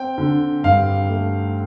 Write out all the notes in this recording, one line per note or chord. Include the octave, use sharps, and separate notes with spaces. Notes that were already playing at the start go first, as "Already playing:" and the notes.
Already playing: C4 G5
D3
G2 F5
A3